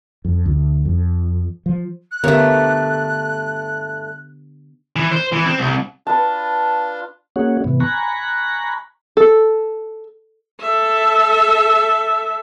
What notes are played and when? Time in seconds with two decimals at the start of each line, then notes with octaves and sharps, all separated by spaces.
0.25 F2
0.46 D2
0.85 F2
1.66 F3
2.11 F#6
2.24 G2 D3 A3 B3 G4 A#4 C#5
4.96 E3
5.12 C5
5.32 E3
5.46 C4
5.58 C2
6.07 D4 F4 B4 A5
7.36 A#3 C#4 F#4 G#4 C#5 F#5
7.64 G#2 C3 E3 B3
7.80 G#5 A#5 B5 C#6 F#6 A#6
9.17 A4
10.61 A4 E5